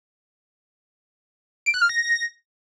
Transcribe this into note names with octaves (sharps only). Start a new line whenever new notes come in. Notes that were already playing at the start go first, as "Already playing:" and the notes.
D7
F#6
F6
A#6